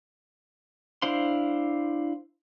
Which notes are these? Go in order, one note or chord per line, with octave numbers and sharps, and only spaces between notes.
D4 E4 C5 F5 C6